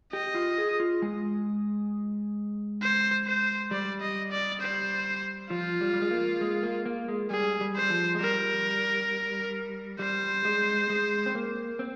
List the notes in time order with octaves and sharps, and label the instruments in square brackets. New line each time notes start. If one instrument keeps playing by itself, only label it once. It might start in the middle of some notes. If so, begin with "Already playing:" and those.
[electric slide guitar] G4 [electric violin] D#5
[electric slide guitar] F4
G#4
F4
G#3
[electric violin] C5
C5
[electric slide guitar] G3 [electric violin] D5
[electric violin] D#5
D5
C5
[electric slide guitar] F3 [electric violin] F4
[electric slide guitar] G3
G3
G#3
A#3
G#3
A#3
A#3
G#3
[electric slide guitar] G3 [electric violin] G#4
[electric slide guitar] G3
[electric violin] C5
[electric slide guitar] G3
F3
G#3
[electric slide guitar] G3 [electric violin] A#4
[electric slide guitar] G3 [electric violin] C5
[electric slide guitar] G#3
G#3
C4
A#3
C4